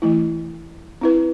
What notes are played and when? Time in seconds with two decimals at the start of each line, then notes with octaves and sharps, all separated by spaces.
0.02 E3 A3 E4
1.01 C4 E4 B4